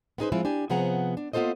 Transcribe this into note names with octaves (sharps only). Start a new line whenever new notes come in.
B3 C#4 D#4 G#4 B4 C5
F3 G#3 C4 E4 F4
D4 G4 G#5
C3 F3 B3 G#4 F#5 A#5
D4
A#3 B3 F4 A4 C5 D#5